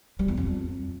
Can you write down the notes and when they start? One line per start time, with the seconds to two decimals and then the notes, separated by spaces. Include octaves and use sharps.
0.19 G3
0.28 E2
0.37 F2